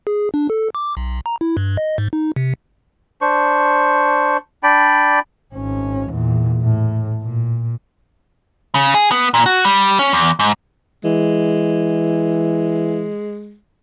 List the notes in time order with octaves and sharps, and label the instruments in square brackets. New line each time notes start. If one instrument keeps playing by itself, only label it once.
[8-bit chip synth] G#4
D4
A4
D6
B1
A#5
E4
G2
D#5
G#2
D#4
C3
[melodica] D4 C5 C#6
D4 D5 G5 B5
[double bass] G#1 C#4
E2 A#2
A2
A#2
[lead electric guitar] C#3
G#4
B3
A#2
F#4
G3
C#4
E2
G#2
[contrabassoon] E3 [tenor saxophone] G#3